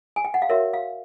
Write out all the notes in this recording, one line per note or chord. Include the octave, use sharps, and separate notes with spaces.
G#5
G5
F#5
F5
F#4 A#4 C#5 E5
F5